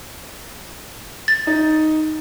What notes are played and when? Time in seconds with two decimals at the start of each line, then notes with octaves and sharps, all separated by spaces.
1.28 A6
1.47 D#4